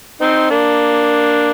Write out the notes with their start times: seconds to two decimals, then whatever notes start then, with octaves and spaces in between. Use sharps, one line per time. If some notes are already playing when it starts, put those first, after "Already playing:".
0.21 C4 D#4
0.50 A#3 D4